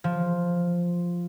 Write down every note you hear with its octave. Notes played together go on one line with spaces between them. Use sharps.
F3